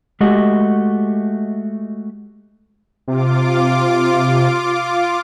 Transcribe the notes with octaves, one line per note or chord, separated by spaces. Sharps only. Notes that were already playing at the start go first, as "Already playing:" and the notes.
G#3 A3 F#4 G4 D#5
C3 F4 D6